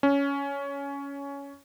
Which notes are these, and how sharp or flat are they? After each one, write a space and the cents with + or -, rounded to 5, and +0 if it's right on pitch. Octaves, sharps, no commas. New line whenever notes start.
C#4 +15